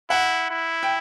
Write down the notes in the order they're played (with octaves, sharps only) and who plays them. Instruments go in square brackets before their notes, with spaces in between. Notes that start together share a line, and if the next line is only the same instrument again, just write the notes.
[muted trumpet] E4 [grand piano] F#5
[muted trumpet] E4
[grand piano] G5